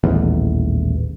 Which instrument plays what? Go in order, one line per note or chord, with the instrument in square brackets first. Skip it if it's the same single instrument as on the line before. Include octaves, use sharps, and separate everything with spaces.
[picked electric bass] D#1 A1 E2